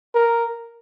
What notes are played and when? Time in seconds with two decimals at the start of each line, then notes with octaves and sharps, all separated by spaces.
0.14 A#4